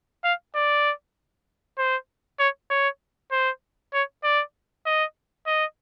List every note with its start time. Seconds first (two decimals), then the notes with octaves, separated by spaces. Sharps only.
0.24 F5
0.55 D5
1.78 C5
2.39 C#5
2.70 C#5
3.32 C5
3.94 C#5
4.24 D5
4.86 D#5
5.46 D#5